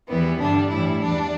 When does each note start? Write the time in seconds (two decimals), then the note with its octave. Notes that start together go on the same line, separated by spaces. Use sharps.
0.09 E2 E3 G3 B3
0.39 G2 D3 G3 D4
0.70 A2 E3 G3 E4
1.00 E2 E3 G3 D4